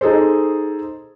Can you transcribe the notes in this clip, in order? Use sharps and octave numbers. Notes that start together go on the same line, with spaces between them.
D#4 G#4 A4 C5